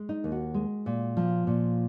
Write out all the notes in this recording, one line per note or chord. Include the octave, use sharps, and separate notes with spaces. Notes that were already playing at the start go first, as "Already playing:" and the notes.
Already playing: G#3
D#4
D#2
F#4
G#3
A#2
F3
A#2